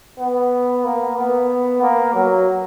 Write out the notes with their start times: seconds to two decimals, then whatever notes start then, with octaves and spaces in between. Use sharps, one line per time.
0.19 B3
0.84 A#3
1.16 B3
1.81 A#3
2.14 F#3